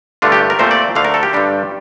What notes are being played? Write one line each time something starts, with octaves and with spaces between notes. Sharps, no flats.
G2 D3 A3 D4 F4
G4
A#4
A#2 A3 C4 C5
D5
D2 D3 A3 F5
A#4
A4
G4
G2 D3 G3 D4